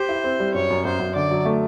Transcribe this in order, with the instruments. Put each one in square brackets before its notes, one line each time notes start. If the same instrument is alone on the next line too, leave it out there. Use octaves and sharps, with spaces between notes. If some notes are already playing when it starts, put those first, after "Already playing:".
Already playing: [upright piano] G4 [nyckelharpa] C5
[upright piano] E4
C4
G3
[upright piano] F#2 [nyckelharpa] C#5
[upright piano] F#2
[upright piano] F#2 [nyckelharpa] C5
[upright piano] F#2
[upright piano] D3 [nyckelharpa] D5
[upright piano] F#3
A3